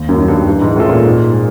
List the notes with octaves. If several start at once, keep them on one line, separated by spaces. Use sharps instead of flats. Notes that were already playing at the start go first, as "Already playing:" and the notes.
Already playing: D#2
F#2
D#3 F#3
G2
G2 E3
G#2
A2 G#3 C#4 F4 A4
A#2
G#2
G#3